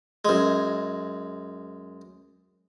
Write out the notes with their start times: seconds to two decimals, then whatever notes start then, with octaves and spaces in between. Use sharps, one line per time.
0.25 F#2 G#3